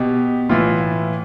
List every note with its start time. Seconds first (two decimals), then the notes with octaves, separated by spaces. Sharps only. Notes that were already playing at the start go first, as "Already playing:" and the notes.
Already playing: B2 G4
0.49 A2 E3 F4